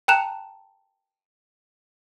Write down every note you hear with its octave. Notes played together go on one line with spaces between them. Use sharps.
G5 A5 A#5 F#6 E7 F7